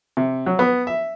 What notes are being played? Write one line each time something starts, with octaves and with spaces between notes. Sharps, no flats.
C3
F#3
B3
E5